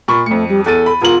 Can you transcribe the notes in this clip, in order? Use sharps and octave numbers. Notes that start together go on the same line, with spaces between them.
A#2 B5 C#6
F2 A3 C#7
G3
E2 A4 A6 D#7
B5
E1 F4 A#4 F#7